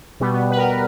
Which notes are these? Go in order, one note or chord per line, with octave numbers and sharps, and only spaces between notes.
B2 G3 B3
B3
B4
A#4